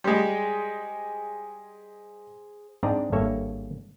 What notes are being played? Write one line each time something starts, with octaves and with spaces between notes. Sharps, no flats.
G3 G#3 G#4 C5
G#2 C4 D4 D5 D#5 A#5
G#1 G2 A#3 A4 C#5 E5